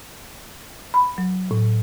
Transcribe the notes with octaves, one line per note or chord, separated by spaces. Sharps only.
B5
F#3
A2